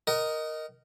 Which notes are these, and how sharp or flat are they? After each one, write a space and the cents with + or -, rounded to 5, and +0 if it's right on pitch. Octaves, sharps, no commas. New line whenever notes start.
A#4 +0 D#5 +0 F#5 +45